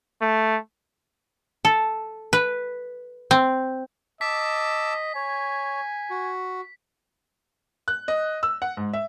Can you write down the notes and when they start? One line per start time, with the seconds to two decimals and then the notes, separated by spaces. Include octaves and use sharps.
0.21 A3
1.65 A4
2.33 B4
3.31 C4
4.21 D#5 A5 D6 E6 B6
5.15 C#5 G#5
6.10 F#4
7.88 F#6
8.08 D#5
8.43 E6
8.62 F#5
8.77 G#2
8.93 E5